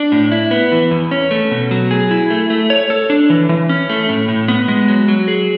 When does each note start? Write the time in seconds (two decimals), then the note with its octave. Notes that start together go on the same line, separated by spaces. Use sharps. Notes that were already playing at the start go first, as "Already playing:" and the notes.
Already playing: D4
0.12 A2
0.32 E4
0.51 B3
0.72 E3
0.91 E2
1.11 C#4
1.31 A3
1.51 B2
1.71 F#3
1.91 G#4
2.11 E4
2.30 A3
2.50 A3
2.70 C#5
2.90 A4
3.10 D4
3.30 E3
3.49 E3
3.69 C#4
3.89 A3
4.09 A2
4.28 A2
4.48 B3
4.68 G#3
4.88 F#3
5.08 F#3
5.28 G#4